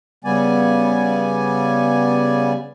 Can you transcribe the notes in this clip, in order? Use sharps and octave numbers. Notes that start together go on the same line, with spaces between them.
C#3 G3 B3 D5 G#5